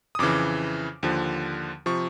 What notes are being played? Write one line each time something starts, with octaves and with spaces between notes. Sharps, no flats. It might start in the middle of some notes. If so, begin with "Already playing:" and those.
D#6
F2 C#3 E3 D6
D#2 D3 F3
C3 F3 C#6